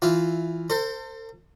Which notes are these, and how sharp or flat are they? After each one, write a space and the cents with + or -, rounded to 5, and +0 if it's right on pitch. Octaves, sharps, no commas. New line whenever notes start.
E3 +5 F4 +0 E5 +10
A4 +45 C5 +0